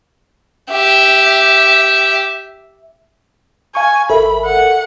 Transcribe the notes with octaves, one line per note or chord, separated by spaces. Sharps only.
G4 E5
F5 G#5 C#6
G#1 A4 A#4 E5 B5
F#5